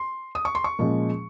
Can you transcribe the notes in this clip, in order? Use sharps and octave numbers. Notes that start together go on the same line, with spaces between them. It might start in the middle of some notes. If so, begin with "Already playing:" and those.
Already playing: C6
D#6
C#6
C6
C#6
A#2 F3 G#3 C#4